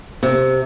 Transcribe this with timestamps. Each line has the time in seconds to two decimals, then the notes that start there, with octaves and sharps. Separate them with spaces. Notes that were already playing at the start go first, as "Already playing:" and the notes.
0.23 C3